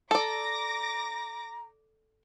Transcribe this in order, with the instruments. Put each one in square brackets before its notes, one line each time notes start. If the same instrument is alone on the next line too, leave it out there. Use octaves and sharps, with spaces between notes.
[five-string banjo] A4 D5 [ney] A#5 [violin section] D6 A#6